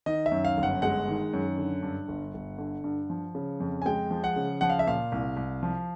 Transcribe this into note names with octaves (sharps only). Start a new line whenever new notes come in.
D#3 D#5
E5
F#2
F5
G1
F#5
G#3 F#5
D#3
F#2
D3
G2
G1
G1
D3
G2
F3
C#3
F2
G#5
G#3 G5
F3
F#5
C#3
F3 F#5
F5
E5
A#2 F5
C2
C2
F3